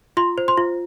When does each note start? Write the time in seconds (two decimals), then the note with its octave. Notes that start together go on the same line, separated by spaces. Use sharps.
0.17 F4 C6
0.38 C5
0.48 C6
0.57 F4